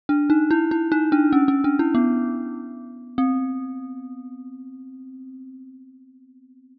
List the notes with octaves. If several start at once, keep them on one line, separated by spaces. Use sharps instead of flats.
D4
D#4
E4
E4
D#4
D4
C#4
C#4
D4
E4
B3
C4